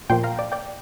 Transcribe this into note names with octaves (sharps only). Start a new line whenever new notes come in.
A#2 F3 A#3 G5 C6
F5 A#5
D5 G5
D5 G5